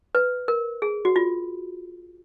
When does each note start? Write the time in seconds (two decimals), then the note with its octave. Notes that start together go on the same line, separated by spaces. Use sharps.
0.15 B4
0.48 A#4
0.82 G#4
1.05 F#4
1.16 F4